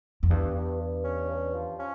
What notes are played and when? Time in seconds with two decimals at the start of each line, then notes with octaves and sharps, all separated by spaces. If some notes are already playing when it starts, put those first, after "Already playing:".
0.23 F2
0.30 E2 G2
0.55 G2
0.80 G2
1.05 C#4
1.29 G2
1.54 F3
1.79 C#4